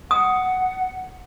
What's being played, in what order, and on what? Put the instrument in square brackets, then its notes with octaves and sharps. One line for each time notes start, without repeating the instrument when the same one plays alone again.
[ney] F#5 [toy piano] D#6